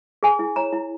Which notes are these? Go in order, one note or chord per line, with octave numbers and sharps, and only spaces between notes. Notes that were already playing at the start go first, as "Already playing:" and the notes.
G#4 G#5
E4
C#5 A#5
E4